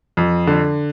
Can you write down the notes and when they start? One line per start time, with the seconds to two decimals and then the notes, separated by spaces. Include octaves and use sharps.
0.17 F2
0.47 D3